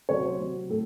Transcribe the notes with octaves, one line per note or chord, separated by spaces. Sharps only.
C3 F#3 C#5
C5
C3 F#3
A2 A4